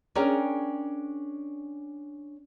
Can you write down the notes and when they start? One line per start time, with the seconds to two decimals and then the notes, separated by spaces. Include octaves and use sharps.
0.15 C#4 D4 G#4 A#4 C#5 G5